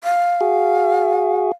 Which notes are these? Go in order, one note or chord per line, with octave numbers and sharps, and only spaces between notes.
F5
F#4 G#4